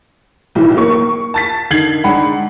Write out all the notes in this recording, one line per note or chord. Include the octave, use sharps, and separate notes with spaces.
B1 A2 D#3 E3
A#3 C#6
A5 A6 B6
D3 D#3 D#4 G#6 C7 F#7
G#2 D4 F#5 B5